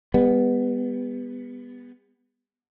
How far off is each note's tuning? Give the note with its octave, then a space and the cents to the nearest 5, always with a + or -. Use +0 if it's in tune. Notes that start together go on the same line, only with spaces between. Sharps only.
G3 +45 B3 +0